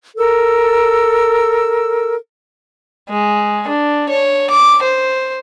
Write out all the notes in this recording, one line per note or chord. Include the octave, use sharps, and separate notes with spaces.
A4 A#4 E6
G#3
D4
C#5
D6
C5